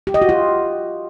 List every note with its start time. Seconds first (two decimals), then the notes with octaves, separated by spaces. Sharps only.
0.07 G4
0.14 D#5
0.22 F#4
0.29 F4